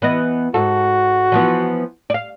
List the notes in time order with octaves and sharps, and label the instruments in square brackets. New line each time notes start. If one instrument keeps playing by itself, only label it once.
[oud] E3 B3 D#5
[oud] G#2 A4 [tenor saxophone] F#4
[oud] E3 F3 B3
D5 F5